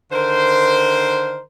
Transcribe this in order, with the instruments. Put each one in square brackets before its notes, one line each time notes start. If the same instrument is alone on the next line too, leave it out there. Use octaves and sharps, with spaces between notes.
[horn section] D3 D#3 A#4 C5